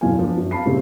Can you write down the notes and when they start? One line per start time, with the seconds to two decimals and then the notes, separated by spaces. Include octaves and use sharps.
0.01 F#1 B1 E2 F4 F5 G#5
0.19 F3 B3 D4
0.37 F#2
0.51 F5 A5 B5 C7
0.65 A#2 C#3 G3 A3 C4